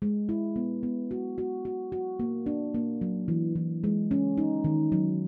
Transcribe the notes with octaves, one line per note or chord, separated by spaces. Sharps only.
G#3
E4
B3
B3
F#4
F#4
F#4
F#4
A#3
D4
A#3
F#3
E3
E3
G#3
C#4
D#4
D#3
F#3